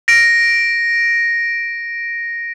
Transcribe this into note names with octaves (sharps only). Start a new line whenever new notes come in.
A#6 D7